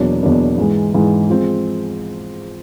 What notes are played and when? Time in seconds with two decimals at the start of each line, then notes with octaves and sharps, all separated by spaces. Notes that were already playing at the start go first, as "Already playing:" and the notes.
Already playing: E2 B2 F#3 A#3 D4
0.23 E2 B2 F#3 A#3 D4
0.58 G#2 E3 G#3
0.94 G#2 E3 G#3
1.30 F3 G#3 C4